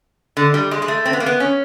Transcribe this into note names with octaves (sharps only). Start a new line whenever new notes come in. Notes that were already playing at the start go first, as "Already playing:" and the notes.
D3
G3
G#3
G#3
A3
C4
B3
A#3
B3
C#4